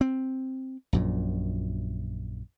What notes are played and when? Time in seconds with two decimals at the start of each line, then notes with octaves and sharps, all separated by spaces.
0.01 C4
0.93 A#1 F#2 A#2